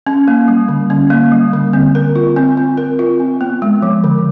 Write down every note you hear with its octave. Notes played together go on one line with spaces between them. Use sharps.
C#4
A#3
G3
D3
C#4
A#3
G3
D3
C4
A#4
F4
C4
C4
A#4
F4
C4
B3
G#3
F3
D3